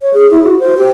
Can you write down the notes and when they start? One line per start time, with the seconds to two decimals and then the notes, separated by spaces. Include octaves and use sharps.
0.02 C#5
0.14 G#4
0.31 E4
0.44 F#4
0.60 C5
0.77 G4